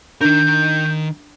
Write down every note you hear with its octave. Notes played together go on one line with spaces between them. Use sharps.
D#3 D4 A#4 G6